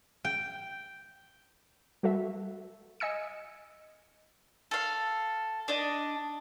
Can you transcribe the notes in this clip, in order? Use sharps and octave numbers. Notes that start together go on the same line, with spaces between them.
G5
G3 F#4 A4 E5
D#5 G#5 E6 C#7
A4 F5
D4 D#5